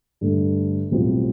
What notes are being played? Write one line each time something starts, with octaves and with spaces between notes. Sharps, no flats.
G2 D3 A3
B1 A2 G3 C4 F4